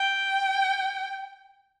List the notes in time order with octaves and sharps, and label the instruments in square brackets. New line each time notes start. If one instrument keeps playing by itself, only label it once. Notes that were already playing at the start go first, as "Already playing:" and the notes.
Already playing: [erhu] G5